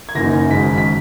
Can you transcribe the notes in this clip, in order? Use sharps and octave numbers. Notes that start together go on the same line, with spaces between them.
G#6
F#1 F#2 E3 A#3 D#4 A#6
G#1 F#2 C#3 G#3 B6
B6